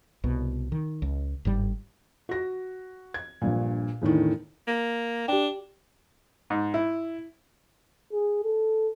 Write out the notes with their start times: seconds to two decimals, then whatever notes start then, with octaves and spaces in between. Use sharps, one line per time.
0.24 C2 B2
0.72 D#3
1.02 C#2
1.45 G1 G#2 G3
2.29 F#4 A#6
3.14 G#6
3.42 A#1 G2 A#2
4.01 E2 A2 D3 D#3
4.67 A#3
5.28 D4 G4 G5
6.50 G#2
6.74 E4
8.12 G#4
8.44 A4